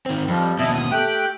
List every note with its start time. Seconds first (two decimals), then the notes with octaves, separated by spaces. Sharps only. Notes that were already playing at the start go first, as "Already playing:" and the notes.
0.06 D#3 C4
0.28 F2 F3 G3
0.59 D#2 B2 E4 D#5 A5
0.74 D#6
0.92 A3 G4 G5 F#6